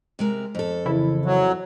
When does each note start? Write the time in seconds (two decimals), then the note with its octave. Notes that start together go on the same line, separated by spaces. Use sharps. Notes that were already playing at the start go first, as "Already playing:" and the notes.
0.19 C3 G#3 A#4
0.55 F2 A4
0.86 C#3 E3 E4
1.25 F#3